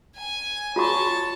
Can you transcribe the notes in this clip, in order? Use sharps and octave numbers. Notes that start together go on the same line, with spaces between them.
G#5
F4 F#4 C#5 A5 C#6